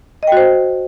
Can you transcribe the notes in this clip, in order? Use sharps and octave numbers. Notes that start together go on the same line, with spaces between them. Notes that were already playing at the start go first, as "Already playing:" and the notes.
F#4 C5 D#5 G5